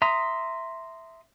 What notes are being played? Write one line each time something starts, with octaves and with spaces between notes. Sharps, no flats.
E5 A#5 C6 D#6